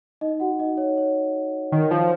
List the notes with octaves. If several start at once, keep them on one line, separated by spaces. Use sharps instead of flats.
D#4 D#5
F#4 F#5
D#4 D#5
C#5
C#5
D#3
F3